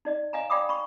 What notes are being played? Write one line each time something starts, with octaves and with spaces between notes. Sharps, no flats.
D#4 D5 D#5
D#5 F5 G#5 A#5
D5 F5 G5 B5 D6 D#6
B5 C#6